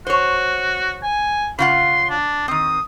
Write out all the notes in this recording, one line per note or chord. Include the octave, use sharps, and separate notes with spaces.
F#4 C5 C#5
G#5
C#3 F4 F#5 C6
D4
D#3 C4 D#6